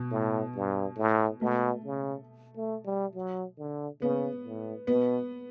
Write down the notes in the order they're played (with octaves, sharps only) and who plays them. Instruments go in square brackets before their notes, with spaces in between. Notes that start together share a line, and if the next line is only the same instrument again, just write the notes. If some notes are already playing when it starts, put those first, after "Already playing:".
Already playing: [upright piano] B2
[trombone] A2
G2
A2
[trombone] B2 [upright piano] A3
[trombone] C#3
A3
G3
F#3
D3
[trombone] C#3 [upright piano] B3
[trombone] A2
[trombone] B2 [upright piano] B3